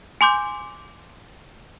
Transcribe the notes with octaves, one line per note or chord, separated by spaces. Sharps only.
G#5 C6 D6 G6